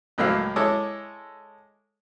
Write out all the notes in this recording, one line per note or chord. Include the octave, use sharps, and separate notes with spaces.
C#2 A2 F#3 A#3 E4 F5
G#3 E4 A4 C#5 D6 D#6